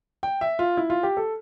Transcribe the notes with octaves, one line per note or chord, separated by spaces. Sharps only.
G5
E5
F4
E4
F4
G4
A4